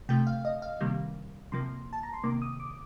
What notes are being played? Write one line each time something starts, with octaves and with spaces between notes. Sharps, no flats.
C3 F3 A3 G5
F5
D#5
F5
C3 D#3 G3 A#3
C3 F3 A#3 C6
A5
A#5
C6
C3 D#3 A#3 D6
D#6
D6